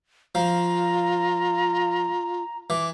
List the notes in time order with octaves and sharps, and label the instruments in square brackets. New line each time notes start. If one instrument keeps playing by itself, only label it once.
[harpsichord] F3 [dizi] F4 [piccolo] A#5
[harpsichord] E3 [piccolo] D6